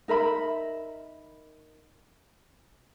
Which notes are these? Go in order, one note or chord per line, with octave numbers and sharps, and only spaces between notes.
D#4 A#4 E5 B5